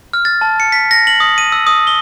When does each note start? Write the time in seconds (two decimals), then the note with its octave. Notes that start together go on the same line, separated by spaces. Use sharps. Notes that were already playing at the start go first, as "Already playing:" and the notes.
0.13 F6
0.25 A6
0.41 A5
0.60 C#7
0.72 B6
0.91 A#6
1.07 F#7
1.20 D#6
1.38 D#7
1.52 E6
1.67 D#6
1.87 G7